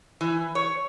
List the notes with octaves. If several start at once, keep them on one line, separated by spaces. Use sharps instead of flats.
E3
C#5